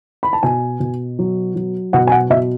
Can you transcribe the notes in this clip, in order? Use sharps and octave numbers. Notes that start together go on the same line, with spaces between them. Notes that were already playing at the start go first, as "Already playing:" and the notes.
B5
A5
B2 G#5
B2
F#3
F#3
B2 F#5
G#5
F#5
B2 E5